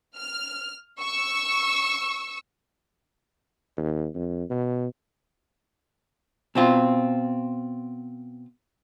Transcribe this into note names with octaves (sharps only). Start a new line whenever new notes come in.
F6
C#6 E6
D#2
F2
B2
B2 C4 F4